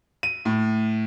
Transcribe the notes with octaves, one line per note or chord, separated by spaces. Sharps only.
D#7
A2